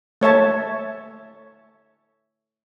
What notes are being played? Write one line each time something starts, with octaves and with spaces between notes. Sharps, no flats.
A3 C#5 E5 A5